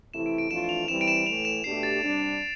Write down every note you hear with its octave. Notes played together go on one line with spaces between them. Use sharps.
C3 E3 A3 E4 E7
D7
D7
F2 E3 A3 D4 F4 E7
F7
E3 G3 C4 E4 E7
D7
E7
A2 E3 A3 F7
E7
B2 A3 D4 G4 C7
A6
C3 G3 D4